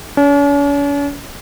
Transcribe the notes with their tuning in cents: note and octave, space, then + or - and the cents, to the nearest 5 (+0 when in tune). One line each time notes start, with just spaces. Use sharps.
C#4 +45